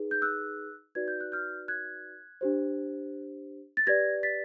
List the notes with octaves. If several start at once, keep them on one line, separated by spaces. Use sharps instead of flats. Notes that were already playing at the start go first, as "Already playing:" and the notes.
Already playing: D#4 G#4 B4
G6
E6 F#6
D#4 F#4 B4 D5 G#6
G6
F#6
F6 G6
F#6 G#6
D4 G4 C5
A6
G4 B4 D5 G#6 A#6
A6 B6